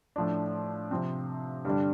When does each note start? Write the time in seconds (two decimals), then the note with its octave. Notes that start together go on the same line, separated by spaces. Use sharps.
0.16 A2 F3 D4
0.91 C3 F3 C4
1.65 G2 D3 G3 D4